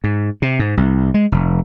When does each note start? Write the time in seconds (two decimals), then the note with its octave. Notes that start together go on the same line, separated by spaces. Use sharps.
0.04 G#2
0.42 C3
0.59 G#2
0.77 C2
1.14 G#3
1.32 F1